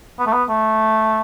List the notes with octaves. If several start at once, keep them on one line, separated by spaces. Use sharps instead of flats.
B3
A3
B3
A3